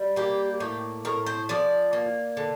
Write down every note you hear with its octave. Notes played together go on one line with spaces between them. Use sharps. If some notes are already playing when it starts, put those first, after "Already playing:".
Already playing: G3
A#3 G4
A2 G4
A2 A#4
C5
F3 D5
A#3
D3